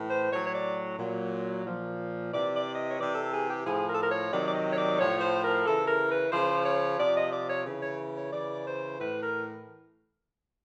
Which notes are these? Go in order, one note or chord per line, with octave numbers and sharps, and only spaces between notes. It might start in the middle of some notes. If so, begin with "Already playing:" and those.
Already playing: A2 E3
C5
A2 F#3 C#5
C#5
D5
A#2 F#3
A#2 F3
C3 E3 D5
D5
D#5
C#5
C3 E3 D5
A4
G#4
G4
A2 F3 G#4
A#4
A4
A#4
C#5
C3 D#3 F#3 D5
D5
D#5
C#5
D5
A2 F3 C#5
C#5
C5
A#4
C#3 E3 A4
A#4
B4
C#3 F3 C5
C#5
C3 F3 D5
D#5
D5
C#5
C#3 E3
C#5
C#5
C#3 E3 D5
C5
A2 E3 B4
A#4